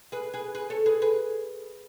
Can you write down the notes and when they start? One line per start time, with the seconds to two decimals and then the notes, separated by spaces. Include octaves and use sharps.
0.12 G#4 B4
0.34 G#4 B4
0.55 G#4 B4
0.70 A4 C#5
0.86 G#4 B4
1.02 G#4 B4